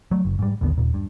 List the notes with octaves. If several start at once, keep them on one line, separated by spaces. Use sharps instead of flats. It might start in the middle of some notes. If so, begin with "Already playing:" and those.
F#3 A3
F#1
G#2 G3
A1 D#2 D3 B3
D#2 A#2
G2